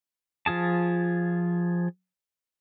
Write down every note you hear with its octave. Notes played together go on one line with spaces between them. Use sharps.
F3 F4 G#4 A5